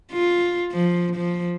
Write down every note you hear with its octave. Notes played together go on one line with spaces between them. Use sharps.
F4
F3
F3